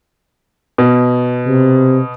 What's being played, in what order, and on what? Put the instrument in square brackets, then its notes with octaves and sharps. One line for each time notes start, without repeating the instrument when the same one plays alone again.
[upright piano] B2
[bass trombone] C3